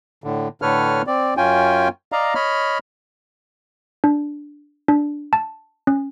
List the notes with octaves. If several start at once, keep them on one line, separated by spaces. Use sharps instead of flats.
A2 D3
A2 D3 A4 B4 C#5 F6
C4 D5
F#2 C#4 F4 G5 G#5
D5 D#5 F5 A#5
C#5 D#5 B5 F6
D4
D4
A5
C#4